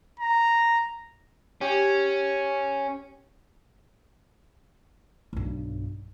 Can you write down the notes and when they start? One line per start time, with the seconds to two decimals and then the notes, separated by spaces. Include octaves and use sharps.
0.20 A#5
1.61 C#4 G4
5.33 B1 G2